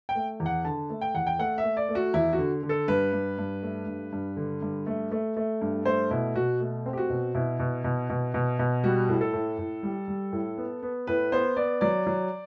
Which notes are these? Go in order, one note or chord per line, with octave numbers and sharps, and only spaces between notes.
G5
A3
E2
F#5
D3 A5
A3
G5
E2 F#5
G5
A3 F#5
E5
A3
D5
A3
F#4
E2 E4
F#4
D3
D3
A4
G2 B4
G2
G2
A3
G2
G2
D3
G2
A3
A3
A3
G2
A3 C5
B2 E4
B2 F#4
A3
C4
G4
F#4
B2
B2 E4
B2
B2
B2
B2
B2
G3 F#4
A2
A4
A2
A2
G3
G3
A2
B3
B3
A2 B4
B3 C5
B3 D5
F#3 D5
F#3